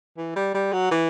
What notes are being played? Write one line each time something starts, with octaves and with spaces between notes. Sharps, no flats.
E3
G3
G3
F#3
E3